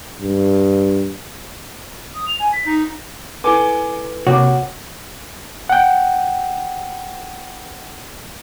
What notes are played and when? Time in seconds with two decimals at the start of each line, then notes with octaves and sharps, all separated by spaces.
0.22 G2
2.15 D#6
2.27 F7
2.40 G#5
2.53 B6
2.67 D#4
3.44 E4 A4 B4 G#5 D6
4.27 C3 A#3 F#4 A#4 C#5 G5 D6
5.69 F#5 G5